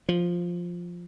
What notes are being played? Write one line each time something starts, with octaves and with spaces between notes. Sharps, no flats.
F3